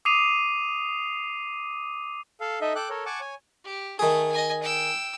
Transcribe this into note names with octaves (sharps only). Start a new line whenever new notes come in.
D6 D#6 C7 D#7 F7
A4 F5
D#4 A4 D#5 E5
A4 G5 D6 F#6
A4 A#4 C#5
F#5 G#5 A5 C#6 D6
C#5 G#5
G4
D#3 A3 G#4
D#5 G#5
G5 E6